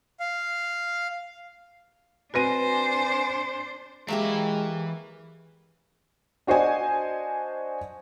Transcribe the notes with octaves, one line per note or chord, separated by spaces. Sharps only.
F5
C4 D4 F#4 B4 C5 G#5 A#6 D#7
E3 F#3 G#3 A#3 G4 E5
D4 F#4 C5 D#5 G#5